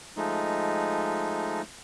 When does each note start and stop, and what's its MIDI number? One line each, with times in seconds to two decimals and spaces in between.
0.17 1.62 53
0.17 1.62 56
0.17 1.62 57
0.17 1.62 63